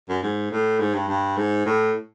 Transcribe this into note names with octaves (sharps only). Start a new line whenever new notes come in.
F#2
G#2
A2
G#2
G2
G2
G#2
A2